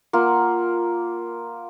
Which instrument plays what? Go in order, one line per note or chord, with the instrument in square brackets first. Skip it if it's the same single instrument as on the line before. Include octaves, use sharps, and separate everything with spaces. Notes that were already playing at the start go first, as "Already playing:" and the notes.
[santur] A#3 F4 F#5